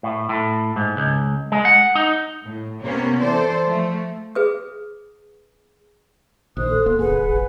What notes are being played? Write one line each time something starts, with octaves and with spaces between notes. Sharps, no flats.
A2
A2
G#2
C#2
G#3
F#5
D#4
A2
C3 A#3 B3 C#4
E3 A4 C5 D5
F3 A3
G#4 B4 D#6
A#1 D#3 C5 D#6 F#6
A4
D1 A#3 B3 C6
F#1 G#4 B4 F#5 G#5
G#1